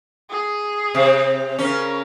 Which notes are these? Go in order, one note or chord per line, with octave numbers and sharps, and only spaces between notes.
G#4
C3 C4
C#3 C#4 A#4